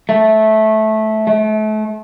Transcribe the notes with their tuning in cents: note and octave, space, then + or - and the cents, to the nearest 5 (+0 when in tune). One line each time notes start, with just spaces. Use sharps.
A3 -15
A3 -35